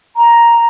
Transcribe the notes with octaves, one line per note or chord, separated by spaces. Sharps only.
A#5